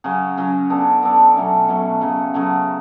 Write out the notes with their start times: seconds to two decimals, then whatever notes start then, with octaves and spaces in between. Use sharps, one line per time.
0.04 C#3 F#3 C#4 F#4
0.37 C#3 F#3 C#4 F#4
0.70 B3 D4 A4 D5
1.03 B3 D4 A4 D5
1.35 B2 F#3 A3 C#4
1.69 B2 F#3 A3 C#4
2.01 C#3 F#3 A3
2.34 C#3 F#3 A3